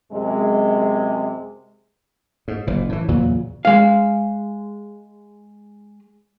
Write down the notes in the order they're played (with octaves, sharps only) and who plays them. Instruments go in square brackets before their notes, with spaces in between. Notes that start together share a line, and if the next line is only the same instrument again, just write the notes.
[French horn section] F#2 C3 G#3
[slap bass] G#2
F#1 A#2
A2 E3
E2 A#2 C#3 F#3
[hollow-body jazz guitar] G#3 F5